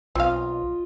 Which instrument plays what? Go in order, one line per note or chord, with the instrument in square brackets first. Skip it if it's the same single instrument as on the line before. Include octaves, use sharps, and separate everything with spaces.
[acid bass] B1 [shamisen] C4 F5 [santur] F4 D#5